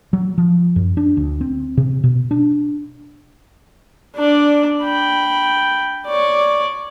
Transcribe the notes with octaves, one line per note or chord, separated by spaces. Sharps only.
F#3
F3
F#2
D4
D2
C4
C3
B2
D4
D4 D5
G5 B5
C#5 D5